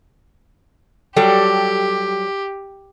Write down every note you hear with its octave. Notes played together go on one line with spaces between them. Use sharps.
F#3 G3 G4 A4